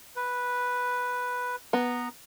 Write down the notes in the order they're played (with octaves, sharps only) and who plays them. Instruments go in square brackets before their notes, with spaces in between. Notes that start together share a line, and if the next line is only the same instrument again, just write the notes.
[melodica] B4
[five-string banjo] B3 [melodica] A#5